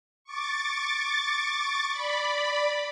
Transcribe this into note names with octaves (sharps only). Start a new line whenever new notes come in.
C#6 D6 A6
D5 B5